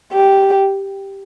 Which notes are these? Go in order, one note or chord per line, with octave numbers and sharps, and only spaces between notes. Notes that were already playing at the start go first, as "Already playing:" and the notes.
G4